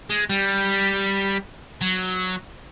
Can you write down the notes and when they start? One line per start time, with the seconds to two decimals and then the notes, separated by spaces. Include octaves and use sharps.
0.10 G#3
0.29 G3
1.81 F#3